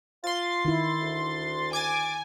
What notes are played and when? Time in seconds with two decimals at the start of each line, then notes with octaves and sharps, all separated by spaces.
0.24 F4 C6 A6
0.65 D#3 E4
1.01 D2
1.73 G#5 D6 G#6 A6